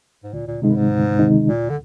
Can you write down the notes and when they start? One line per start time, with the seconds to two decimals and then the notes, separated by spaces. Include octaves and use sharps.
0.24 G#2
0.33 D2 A#2
0.47 A#2
0.62 G#2 C3 D#3 G#3 D#4
0.69 G2
0.76 G#2
0.91 D2
1.19 C3 D#3 G#3 D#4
1.48 D2 A#2
1.70 D3